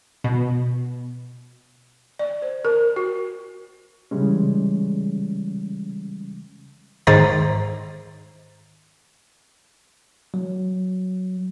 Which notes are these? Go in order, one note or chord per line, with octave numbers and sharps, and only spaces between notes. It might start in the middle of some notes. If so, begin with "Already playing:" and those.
B2
D5
C5
A#4
F#4
C#3 E3 G3 G#3 C#4
G#2 D#3 C5 A#5 A6
F#3